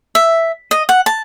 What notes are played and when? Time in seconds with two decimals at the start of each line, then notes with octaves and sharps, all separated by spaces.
0.15 E5
0.71 D#5
0.89 F#5
1.06 A5